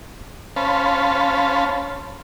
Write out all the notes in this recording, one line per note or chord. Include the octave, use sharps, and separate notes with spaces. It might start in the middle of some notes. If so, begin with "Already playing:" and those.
C#4 C5 F5 A5 B5